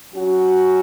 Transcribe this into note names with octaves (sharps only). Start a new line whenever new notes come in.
F#3 C#4 F#4